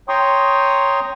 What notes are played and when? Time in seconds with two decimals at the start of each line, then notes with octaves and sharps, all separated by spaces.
0.09 C#5 G5 A#5 C6 C#6 D#6